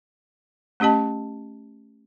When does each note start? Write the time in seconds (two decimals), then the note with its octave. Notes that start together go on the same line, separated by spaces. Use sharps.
0.80 A3 C#4 G4 D#5 A5